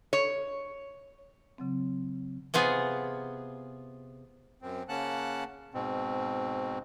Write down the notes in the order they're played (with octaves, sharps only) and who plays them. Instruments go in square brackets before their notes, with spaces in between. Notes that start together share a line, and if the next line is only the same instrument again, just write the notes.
[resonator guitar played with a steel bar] C#5
[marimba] C#3 F#3 C4
[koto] C3 B3 F4 G#4
[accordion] F#2 C4
C#3 A#3 C#4 F#5 A5 F#6
[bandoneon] G#2 B2 C4